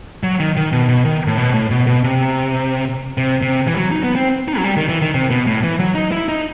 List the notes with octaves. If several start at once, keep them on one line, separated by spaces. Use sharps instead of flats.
F#3
D#3
D#3
B2
B2
D#3
A2
B2
A2
B2
B2
C3
C3
C3
E3
G3
F#3
D#4
B3
C4
D#4
F#3
G3
D#3
E3
D#3
C3
B2
A2
E3
F#3
D#4
E4
D#4